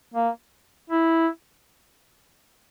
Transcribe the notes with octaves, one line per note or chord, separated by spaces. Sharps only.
A#3
E4